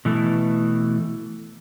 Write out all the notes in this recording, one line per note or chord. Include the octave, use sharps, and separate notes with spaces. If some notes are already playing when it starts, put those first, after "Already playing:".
B2 E3 A3